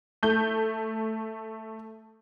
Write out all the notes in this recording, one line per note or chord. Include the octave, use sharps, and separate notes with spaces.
A3 G6